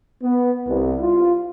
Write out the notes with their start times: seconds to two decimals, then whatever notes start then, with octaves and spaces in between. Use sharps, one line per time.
0.23 B3
0.68 C2
1.02 F4